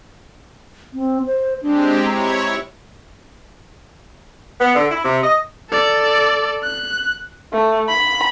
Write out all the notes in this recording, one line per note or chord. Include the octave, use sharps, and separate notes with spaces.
C4
C5
G#3 C4 D4 G4
E4 C#5 A#5
B3
D3
E4
C3
D#5
A4 D5
F#6
A3
B5